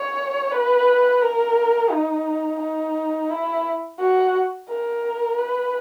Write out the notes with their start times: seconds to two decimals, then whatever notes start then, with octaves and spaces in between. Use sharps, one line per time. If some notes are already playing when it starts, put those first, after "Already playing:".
Already playing: C#5
0.52 B4
1.21 A#4
1.91 D#4
2.60 D#4
3.30 E4
3.99 F#4
4.69 A#4
5.39 B4